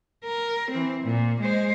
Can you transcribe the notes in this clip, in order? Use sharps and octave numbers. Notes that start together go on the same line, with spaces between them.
A#4
E3 C4
A#2
G#3 C5